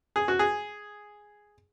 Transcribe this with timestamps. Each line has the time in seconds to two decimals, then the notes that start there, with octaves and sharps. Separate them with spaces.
0.16 G#4
0.28 F#4
0.39 G#4